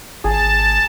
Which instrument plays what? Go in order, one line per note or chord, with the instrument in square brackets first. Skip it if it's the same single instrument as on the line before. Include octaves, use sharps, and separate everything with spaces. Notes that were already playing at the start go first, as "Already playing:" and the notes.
[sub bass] G#1 [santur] G#4 [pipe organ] A5